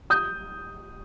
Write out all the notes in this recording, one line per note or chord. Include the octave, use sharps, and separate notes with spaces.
D#6 G6